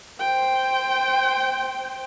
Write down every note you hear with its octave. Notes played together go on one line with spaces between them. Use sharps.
C5 G5